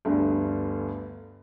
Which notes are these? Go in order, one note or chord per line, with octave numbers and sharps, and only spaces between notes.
G1 D2 G2